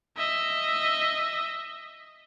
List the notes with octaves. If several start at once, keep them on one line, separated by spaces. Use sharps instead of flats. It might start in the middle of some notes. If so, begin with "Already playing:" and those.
D#5 E5